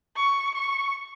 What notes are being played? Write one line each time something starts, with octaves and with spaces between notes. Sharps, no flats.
C#6
C#6